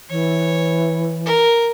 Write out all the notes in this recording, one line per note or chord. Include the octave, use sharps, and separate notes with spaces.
E3 C#5
A#4